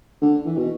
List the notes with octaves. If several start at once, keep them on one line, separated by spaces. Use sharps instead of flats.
D3
E3
B2